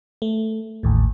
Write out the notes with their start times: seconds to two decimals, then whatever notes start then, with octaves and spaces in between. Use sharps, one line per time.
0.22 A3
0.83 A1 D#2 A2